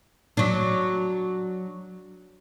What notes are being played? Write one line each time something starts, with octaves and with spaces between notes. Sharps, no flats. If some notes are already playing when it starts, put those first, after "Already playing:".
F#3 D4